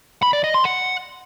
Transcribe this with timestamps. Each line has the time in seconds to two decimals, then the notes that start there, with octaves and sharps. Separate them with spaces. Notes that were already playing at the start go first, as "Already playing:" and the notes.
0.22 B5
0.33 D5
0.44 D#5
0.54 C6
0.65 F#5